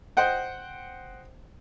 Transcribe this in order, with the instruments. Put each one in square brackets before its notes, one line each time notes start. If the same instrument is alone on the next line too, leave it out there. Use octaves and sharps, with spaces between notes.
[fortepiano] C5 D#5 F#5 G5